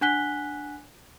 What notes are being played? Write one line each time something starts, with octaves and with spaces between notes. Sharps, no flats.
D4 F#5 G#5 F#6 B6 G7